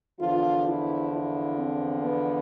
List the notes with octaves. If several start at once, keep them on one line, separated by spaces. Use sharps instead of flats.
E2 D3 F3 F4
E4
E4
C4
B3